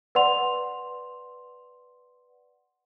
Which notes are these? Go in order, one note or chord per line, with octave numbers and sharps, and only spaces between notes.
B4 D5 F#5 C6 F7